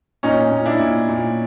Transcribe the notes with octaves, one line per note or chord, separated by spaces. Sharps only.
A#2 C#4 D#4
A#2
D4 E4
A#2
A#2